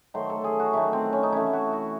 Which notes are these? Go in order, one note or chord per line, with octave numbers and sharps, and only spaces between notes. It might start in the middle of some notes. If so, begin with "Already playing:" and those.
D#3 F#3 A3 C5
A4
G#4
F#4
D#3 F#3 A3 E4
C4
C#4
D#4
C3 E3 A3 E4
F#4
F#4